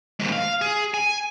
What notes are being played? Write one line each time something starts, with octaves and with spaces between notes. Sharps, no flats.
D#2 G#2
F5
G#4
G#5